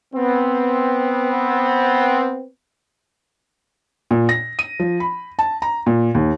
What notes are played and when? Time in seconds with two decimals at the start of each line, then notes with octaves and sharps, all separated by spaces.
0.15 B3 C4
4.11 A#2
4.29 A#6
4.59 D#7
4.80 F3
5.00 B5
5.39 A5
5.62 A#5
5.86 A#2
6.15 D#2